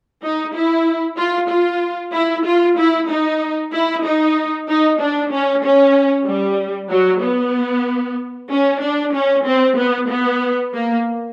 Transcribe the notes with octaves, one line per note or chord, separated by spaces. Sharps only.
D#4
E4
F4
F4
E4
F4
E4
D#4
E4
D#4
D#4
D4
C#4
C#4
G3
F#3
B3
C#4
D4
C#4
C4
B3
B3
A#3